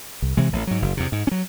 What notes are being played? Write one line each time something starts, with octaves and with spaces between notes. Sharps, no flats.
C2
C3 E3 G#3
A1
G#2 F#3
F#1
E2 C3
G#2
C#4
F#3